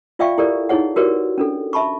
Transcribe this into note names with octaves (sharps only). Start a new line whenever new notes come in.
F4 D5 E5 F5 G5 C#6
E4 G4 A4 A#4 D5
D#4 E4 G#4 C#5 F#5
F#4 G4 A#4 B4 C#5 D5
C#4 D4 A4
E5 A5 B5 C#6